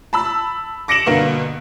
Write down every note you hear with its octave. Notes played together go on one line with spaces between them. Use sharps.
A5 B5 E6
D6 A#6 C#7 D7 E7 F#7
G2 B2 D3 A#3 B3